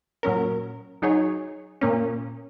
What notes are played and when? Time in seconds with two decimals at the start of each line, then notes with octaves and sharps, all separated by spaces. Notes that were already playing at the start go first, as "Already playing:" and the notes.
0.23 A#2 F#3 C#4 A#4
1.02 F#3 D#4 G#4 C#5
1.81 A#2 A#3 C#4